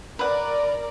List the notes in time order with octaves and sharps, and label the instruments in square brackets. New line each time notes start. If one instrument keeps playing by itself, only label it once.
[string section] A#4 D5 [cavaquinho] B4 F#5